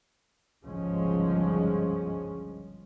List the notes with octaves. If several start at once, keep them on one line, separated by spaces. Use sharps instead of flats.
G1 C#2 G#2 F3 G#3 C#4